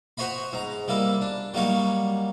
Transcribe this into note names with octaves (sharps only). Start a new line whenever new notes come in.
F#4 C5 C#5 D#5 B5
G#2 A#5
G3 A#3 E4
D4
F#3 G3 A#3 D#4 C#5